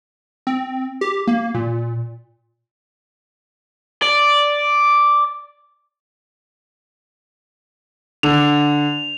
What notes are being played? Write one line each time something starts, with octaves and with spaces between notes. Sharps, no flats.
C4
G4
A#3
A#2
D5
D3 F7